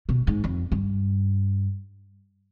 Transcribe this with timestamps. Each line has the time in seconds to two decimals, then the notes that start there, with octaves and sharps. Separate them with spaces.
0.09 B2
0.27 G#2
0.44 F2
0.72 G2